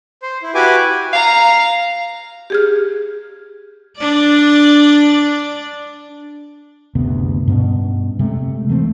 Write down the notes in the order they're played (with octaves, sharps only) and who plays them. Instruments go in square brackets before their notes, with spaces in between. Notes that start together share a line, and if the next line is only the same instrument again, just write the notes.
[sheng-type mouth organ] C5
E4
E4 F#4 G4 B4 G#5 D6
[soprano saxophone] F5 [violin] A#5 F7
[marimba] G4 G#4 F6
[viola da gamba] D4 D5
[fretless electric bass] F#1 D2 C3 B3
G2 B2 C#4
C3 G#3 A3
E3 A3 A#3 C4